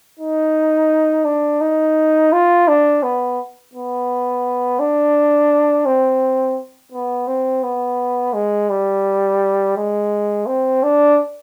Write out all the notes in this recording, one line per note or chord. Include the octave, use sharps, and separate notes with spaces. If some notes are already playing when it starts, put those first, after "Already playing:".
D#4
D4
D#4
F4
D4
B3
B3
D4
C4
B3
C4
B3
G#3
G3
G#3
C4
D4